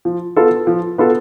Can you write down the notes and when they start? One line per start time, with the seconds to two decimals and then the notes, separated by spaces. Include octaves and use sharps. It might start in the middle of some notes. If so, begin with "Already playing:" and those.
0.05 F3
0.36 B3 F4 A4
0.67 F3
0.98 B3 F4 A4